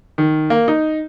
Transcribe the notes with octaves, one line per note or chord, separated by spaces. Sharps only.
D#3
A#3
D#4